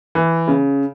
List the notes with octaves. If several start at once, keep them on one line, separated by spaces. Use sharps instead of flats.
E3
C#3